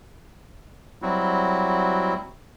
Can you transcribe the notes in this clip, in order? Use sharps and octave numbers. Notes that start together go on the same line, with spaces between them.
F#3 G3 C4 E4 F#4